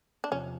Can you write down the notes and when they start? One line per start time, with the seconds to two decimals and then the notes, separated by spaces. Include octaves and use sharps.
0.24 D4
0.31 E2 C3 F3 C#4